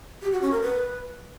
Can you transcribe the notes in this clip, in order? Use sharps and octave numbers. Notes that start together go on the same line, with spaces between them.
G4
F#4
C#4
A#4
B4